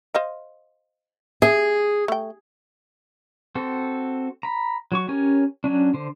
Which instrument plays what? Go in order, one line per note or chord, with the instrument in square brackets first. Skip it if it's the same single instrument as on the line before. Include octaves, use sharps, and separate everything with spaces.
[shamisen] C5 D#5 F5
[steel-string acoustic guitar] G#4 [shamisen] E5
[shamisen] A3 G5
[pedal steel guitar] C4 F#4 A4
A#5 B5
F#3 F#4 C#6
C#4 G4 A#4 C#5 G#5
F#3 C#4 D4
D3 C5